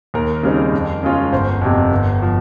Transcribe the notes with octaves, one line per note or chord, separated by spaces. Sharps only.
D#2 A#4
C#3 G3 C4 D#4
F2
C#3 G#3 C#4 F4
G1 C5
F2 C3
G1
F3